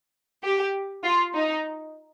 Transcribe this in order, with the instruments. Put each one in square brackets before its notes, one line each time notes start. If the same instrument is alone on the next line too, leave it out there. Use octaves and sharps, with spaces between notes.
[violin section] G4
F4
D#4